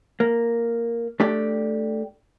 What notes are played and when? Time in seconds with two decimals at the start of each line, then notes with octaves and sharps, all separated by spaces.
0.20 A#3
1.20 A3 D4 G4 D5